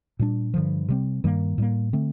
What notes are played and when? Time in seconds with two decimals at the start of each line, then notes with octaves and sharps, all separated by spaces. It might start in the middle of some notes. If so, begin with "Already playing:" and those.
0.19 A#2 G3 D4
0.54 G2 D3 F3
0.89 C3 G3 C4
1.24 G2 D#3 G3 A#3
1.58 A2 G3 A#3
1.93 D3 A3 C4